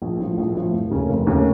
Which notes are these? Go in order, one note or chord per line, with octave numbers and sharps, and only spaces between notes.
A#1
A2 F3
A#1
A2 F3
F1
D#2 C#3 A3 C#4
F1
D#2 C#3 A3 C#4